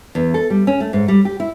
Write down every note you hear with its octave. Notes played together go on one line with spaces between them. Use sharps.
E2
A4
G3
C#4
A3
G#2
G3
G4
E4